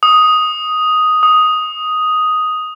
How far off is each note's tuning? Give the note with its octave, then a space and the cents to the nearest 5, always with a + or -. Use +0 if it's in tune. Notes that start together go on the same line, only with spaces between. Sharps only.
D#6 +0
D#6 +0